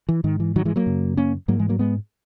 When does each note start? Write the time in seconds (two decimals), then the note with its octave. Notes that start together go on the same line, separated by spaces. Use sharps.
0.09 E3
0.24 G#2 D#3
0.40 E3
0.56 D#3 F#3
0.65 E3 G#3
0.76 F#3 A#3
0.86 F#2 C#3
1.17 A#3 C#4
1.48 G#2 F#3 A#3
1.59 E3 G#3
1.69 F#3 A#3
1.79 G#3 B3